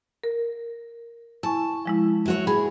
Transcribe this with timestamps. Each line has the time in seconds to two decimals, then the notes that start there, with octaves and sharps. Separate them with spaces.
0.24 A#4
1.43 E4 G#5 A5 C#6
1.86 F3 G#3 E4
2.26 E4 F#4 C#5
2.47 G#4 B5